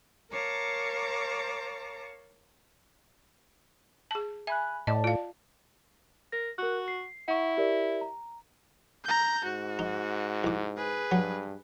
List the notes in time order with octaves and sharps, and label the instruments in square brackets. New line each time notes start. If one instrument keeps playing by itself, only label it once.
[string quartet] A#4 C#5 F5 A5 A#5 D6
[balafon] G#4 A5
[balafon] E5 [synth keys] G#5 B5 F#6
[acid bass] A2 [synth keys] D5 A5 [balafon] D#5
[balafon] F4 F5
[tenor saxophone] A#4 [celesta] A#6
[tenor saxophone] F#4 [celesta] A#4 F#6
[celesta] C7
[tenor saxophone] E4 [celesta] F#5 C#6
[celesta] G4 A#4 D5
A#5
[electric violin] A#5 G6
[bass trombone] G#2 [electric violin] F#4
[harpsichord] D#4
C2 D6
[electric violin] G#4 B4
[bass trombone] G2 [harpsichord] F#3